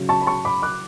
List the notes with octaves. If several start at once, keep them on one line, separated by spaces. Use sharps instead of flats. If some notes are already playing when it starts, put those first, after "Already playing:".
Already playing: C#3 F#3
A5 C#6
B5
A5 C#6
B5 D6
D6 F#6